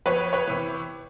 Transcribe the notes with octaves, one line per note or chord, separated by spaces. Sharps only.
F2 B4 C#5
B4 C#5
C3 E3